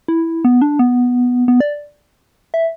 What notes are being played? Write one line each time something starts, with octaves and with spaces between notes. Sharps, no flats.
E4
B3
D4
B3
B3
D5
E5